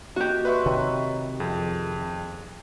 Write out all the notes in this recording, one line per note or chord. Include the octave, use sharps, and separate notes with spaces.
A#3 F#4 G4 D#5
B4 D5 E5 C6 C#6
C3 D#3 C#5 D#5 A#5
F2 G#4